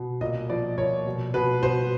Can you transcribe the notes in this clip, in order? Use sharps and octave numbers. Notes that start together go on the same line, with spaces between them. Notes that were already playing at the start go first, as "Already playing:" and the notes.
Already playing: B2
A#2 D#5
F3 D5
A#2 C#5
B2
B2 B4
B2 C5